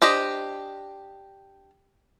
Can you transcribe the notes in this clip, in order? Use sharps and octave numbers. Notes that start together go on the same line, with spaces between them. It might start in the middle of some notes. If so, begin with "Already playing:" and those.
D4 G4 C5 D#5